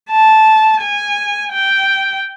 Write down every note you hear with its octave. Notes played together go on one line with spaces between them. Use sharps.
A5
G#5
G5